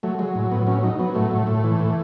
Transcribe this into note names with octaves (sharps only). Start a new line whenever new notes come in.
F#3 A3
F#3 G#3
A2
A2 B3
F#3 C#4
F#3 D#4
F#3 B3
A2 A3
A2
A2
E3
A2